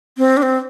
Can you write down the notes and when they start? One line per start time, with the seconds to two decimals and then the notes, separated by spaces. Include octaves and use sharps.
0.18 C4
0.37 D4
0.42 C4